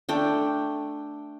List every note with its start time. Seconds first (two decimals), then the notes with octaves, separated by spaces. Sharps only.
0.09 A3 D4 G5